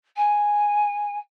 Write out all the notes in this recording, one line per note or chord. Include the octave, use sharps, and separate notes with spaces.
G#5